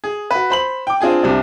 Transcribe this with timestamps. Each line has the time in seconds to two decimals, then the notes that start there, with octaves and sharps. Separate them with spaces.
0.04 G#4
0.31 F#4 B4
0.50 C5 B5 F#7
0.87 G5 D6
1.01 C4 D4 F4 G#4 G#5
1.23 C2 C3 D4